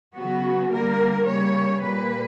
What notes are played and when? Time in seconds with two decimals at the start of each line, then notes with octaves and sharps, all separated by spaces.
0.15 C#3 F#3 B3 F#4
0.71 D3 G3 A#3 A#4
1.27 C#3 G3 A#3 C#5
1.81 A#2 G3 A#3 B4